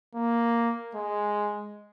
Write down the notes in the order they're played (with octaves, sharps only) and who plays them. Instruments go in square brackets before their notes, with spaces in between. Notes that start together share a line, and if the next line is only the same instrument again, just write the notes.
[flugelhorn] A#3
G#3